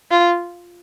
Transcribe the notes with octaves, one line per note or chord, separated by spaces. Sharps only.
F4